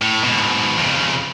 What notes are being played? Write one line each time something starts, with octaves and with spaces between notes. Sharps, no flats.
A2
G#2 B2
F2 C#3